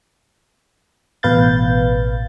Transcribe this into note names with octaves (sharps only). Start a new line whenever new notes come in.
A1 B2 B4 F5 G6 A6